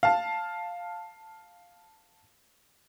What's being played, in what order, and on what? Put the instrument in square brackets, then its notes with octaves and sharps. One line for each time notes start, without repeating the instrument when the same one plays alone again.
[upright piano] F5 A5